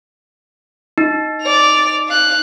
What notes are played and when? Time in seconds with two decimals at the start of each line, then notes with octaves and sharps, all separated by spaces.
0.98 D#4
1.42 D5 F7
2.08 F5 F#6